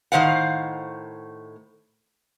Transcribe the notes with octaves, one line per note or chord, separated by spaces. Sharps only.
A2 D#3 C5 F5 F#5